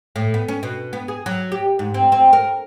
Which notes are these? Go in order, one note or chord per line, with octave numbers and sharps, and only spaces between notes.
A2
B3
C#4
B2
B3
G#4
F#3
G4
G#2
C4
C4
A#4